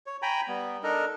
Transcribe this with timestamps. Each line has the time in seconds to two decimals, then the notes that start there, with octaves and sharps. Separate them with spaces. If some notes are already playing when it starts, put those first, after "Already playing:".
0.06 C#5
0.22 G5 G#5 A#5 B5
0.48 G3 B3
0.83 D4 D#4 A4 A#4 D#5